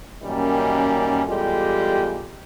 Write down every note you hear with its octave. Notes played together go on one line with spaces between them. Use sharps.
F#2 D#3 G3 A#3 C#4 D#4
E2 G3 G#3 F4 G4 A4